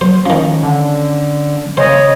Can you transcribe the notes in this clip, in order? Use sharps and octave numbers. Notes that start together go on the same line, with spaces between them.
F#3 C5
D#3 F3 C#4
D3
C#3 C5 C#5 D#5